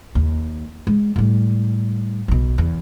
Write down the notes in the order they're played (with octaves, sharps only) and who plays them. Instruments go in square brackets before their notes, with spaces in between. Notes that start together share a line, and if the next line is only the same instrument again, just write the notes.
[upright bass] D#2
G#3
A2 G3
B1 B2
E2